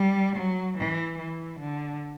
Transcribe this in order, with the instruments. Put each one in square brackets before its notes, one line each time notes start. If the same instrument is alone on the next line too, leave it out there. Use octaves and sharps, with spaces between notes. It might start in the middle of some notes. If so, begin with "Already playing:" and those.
Already playing: [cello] G3
F#3
E3
E3
D3